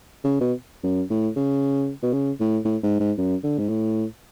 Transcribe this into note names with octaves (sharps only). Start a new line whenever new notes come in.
C#3
B2
F#2
A2
C#3
B2
C#3
A2
A2
G#2
G#2
F#2
D3
G#2
A2